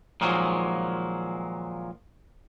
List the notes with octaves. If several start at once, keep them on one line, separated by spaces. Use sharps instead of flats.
A#2 D#3 F3 F#3 G#3